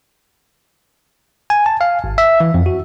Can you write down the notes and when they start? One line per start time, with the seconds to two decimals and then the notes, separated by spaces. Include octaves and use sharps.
1.50 G#5
1.66 A5
1.81 F5
2.04 G#1
2.18 E5
2.40 E3
2.54 F2
2.66 F#4